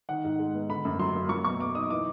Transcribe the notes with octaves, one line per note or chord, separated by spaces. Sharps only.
D#3 F#5
G#2
G#3
B3
D3 B5
F#2
F#3 C6
A#3
F#3 C#6
B2 C#6
B3 D6
D#4 D#6
E3 D6